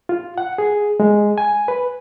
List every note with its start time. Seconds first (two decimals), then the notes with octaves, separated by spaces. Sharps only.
0.09 F4
0.38 F#5
0.58 G#4
1.00 G#3
1.38 G#5
1.68 B4